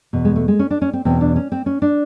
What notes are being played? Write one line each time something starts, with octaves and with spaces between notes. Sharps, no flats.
E2 B2
G#3
A3
G#3
C#4
D4
C#4
C4
E2 B2 C4
D4
C#4
C4
C#4
D4